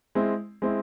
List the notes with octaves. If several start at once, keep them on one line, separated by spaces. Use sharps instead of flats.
G#3 C4 E4
G#3 C4 E4